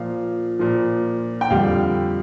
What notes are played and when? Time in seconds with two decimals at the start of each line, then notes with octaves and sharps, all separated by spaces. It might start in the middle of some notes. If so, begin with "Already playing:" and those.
Already playing: A#2 F3 F5
0.59 A#2 F3
1.41 G5
1.50 F2 D3 G3 F5